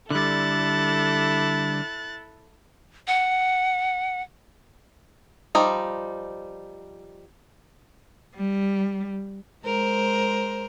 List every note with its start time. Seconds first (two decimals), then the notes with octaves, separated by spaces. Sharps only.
0.10 D3 G3 E4 A4 F#6 A6
3.07 F#5
5.55 F3 G3 D#4
8.35 G3
9.64 G#3 A#4 C5